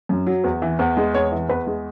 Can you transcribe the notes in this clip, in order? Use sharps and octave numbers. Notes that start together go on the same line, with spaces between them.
F#2
F#3
E2
E3
E2
G#3
E2 C#5
E3
E2 B4
G#3